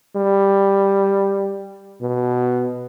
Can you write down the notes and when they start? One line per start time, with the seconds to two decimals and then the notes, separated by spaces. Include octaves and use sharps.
0.16 G3
2.02 B2